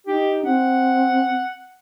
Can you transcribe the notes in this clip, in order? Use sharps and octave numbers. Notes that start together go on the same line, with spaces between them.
D#4 G4
C4 F#5